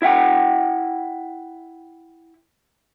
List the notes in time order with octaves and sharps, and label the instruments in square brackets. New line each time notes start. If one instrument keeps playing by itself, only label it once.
[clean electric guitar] E4 E5 F#5 G5